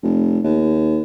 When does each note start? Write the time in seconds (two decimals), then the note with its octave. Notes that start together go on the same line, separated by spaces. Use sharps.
0.03 F1
0.44 D#2